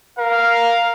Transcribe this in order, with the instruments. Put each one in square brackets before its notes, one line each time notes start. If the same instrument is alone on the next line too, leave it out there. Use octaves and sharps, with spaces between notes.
[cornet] A#4 [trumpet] F5